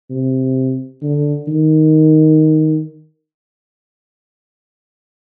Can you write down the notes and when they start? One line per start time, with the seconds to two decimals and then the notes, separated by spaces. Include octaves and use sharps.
0.10 C3
1.03 D3
1.48 D#3